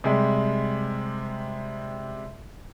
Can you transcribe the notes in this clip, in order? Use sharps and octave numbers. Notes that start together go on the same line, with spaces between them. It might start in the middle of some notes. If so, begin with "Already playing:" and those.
C3 G3 G#3